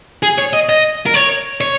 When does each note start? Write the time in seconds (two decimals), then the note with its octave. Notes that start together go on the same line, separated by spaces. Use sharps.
0.23 G#4
0.38 C#5
0.53 D#5
0.69 D#5
1.06 A#4
1.14 C#5
1.61 C#5